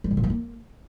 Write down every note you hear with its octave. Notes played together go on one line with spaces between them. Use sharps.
G3
C#3
A#2
G3
A#3